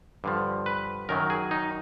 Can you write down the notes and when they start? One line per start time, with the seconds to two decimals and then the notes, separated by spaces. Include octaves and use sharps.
0.24 G2 D3 F3
0.66 B4
1.09 F#2 D#3 F#3 A#4
1.30 G#4
1.51 D#4